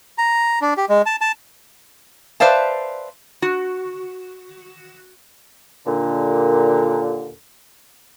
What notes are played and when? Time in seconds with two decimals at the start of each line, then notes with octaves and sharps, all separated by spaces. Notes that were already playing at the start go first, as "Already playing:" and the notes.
0.18 A#5
0.62 D4
0.77 G4
0.89 G#3
1.06 A5
1.21 A5
2.40 B4 C5 D5 E5 F5 A5
3.42 F#4
5.86 D#2 A#2 D3